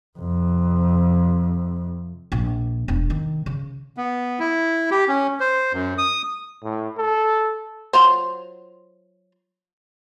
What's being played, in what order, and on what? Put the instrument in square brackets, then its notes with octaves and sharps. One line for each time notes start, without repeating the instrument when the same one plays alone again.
[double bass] F2 C3
[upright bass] A#1
E1 D4
D#3
C#3
[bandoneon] B3
E4
G4
C#4
C5
F#2
D#6
[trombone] A2
A4
[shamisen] F#3 F4 C5